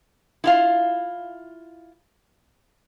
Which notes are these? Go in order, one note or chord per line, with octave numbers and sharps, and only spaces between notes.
E4 F4 F5